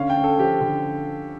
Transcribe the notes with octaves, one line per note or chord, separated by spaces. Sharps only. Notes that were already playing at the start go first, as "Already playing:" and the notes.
Already playing: D3 C#4 F5
G5
C#4
A4
F3 G4
D3